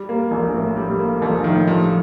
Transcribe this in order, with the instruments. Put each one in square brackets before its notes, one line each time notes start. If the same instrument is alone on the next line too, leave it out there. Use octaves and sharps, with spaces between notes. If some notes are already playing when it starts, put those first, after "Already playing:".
Already playing: [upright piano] G3
A#3
A#1
A2
G3
A#3
[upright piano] A#1 [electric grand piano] F3
[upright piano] A2 [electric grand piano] D#3
[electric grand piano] F3 [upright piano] G3